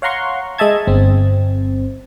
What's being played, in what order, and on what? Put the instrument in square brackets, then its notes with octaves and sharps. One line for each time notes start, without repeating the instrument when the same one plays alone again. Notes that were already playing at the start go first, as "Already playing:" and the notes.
[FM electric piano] C#5 F5 F#5 A#5 C6 C#6
G#3 D#5 E5 A5 G#6
G1 C4